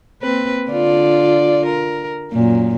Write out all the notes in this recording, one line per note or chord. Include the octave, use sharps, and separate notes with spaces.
A#3 C4 B4
D3 F4 D5
A#4
F#2 A#2